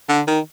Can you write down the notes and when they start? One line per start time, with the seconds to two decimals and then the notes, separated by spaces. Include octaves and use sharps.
0.09 D3
0.27 D#3